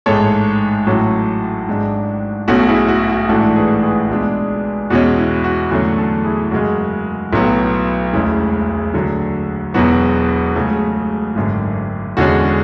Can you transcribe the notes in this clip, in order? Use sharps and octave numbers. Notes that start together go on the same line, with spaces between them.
A1 G#2 G#3 A4 C#5
A1 A2 F#3 C#4 F#4 A4
G#1 G#2 G#3 D4
B1 B2 A3 C#4 F#4 A4
E4 G#4
F#4
F#4
A1 G#2 E3 A3 D4 F#4 A4
G#4 B4
G#4 B4
C#2 B2 G#3 D4
E2 B2 G#3 C#4 F#4
E4
F#4
E2 D3 F#3 A3 C#4 F#4
F#4 A4
E4 G#4
F#2 C#3 G#3 F#4
B1 A2 F#3 B3
E1 D2 C#3 G#3 C#4 E4
D2 D3 F#3 F#4
E1 E2 B2 F#3 B3 F#4
C#2 C#3 F#3 A3
G#1 F#2 D3
E1 E2 D3 G#3 C#4 F#4